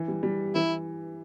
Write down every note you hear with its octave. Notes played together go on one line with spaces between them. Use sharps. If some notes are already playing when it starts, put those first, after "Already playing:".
Already playing: E3
G3
G3
E3 E4